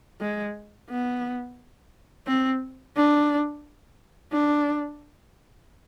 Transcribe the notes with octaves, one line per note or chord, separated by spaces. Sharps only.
G#3
B3
C4
D4
D4